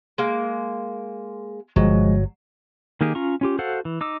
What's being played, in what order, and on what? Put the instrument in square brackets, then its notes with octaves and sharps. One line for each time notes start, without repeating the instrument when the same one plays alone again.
[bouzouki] G#3 A#3
[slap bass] G1 [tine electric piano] F3 G#3 [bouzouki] F#3
[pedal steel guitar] D#3 A#3 D#4 G4 G#4
C#4 F4 A#5 C#6
C#4 F4 G4
F#4 A4 C5 F5 F#5
E3
D#4 D6 E6